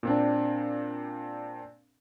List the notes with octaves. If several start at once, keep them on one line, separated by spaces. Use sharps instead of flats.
A#2 C4 D4